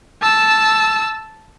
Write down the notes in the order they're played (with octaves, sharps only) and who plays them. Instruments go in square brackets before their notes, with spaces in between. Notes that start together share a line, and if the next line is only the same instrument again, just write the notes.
[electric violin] A5 E6